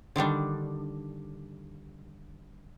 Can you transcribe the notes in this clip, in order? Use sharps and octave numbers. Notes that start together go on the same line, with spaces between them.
D3 D#3 G3 D4